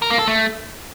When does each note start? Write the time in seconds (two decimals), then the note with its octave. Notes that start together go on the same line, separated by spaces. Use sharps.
0.02 A#4
0.10 A#3
0.19 A4
0.27 A3